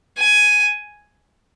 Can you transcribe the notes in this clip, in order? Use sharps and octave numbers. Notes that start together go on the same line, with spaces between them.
G#5